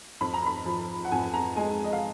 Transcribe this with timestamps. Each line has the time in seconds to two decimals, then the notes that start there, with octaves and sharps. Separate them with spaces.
0.21 F2 B5
0.34 A#5
0.46 B5
0.66 F3
1.05 F#5
1.11 F2 G#5
1.34 A#5
1.56 G#3 G#5
1.84 D#5
1.93 F5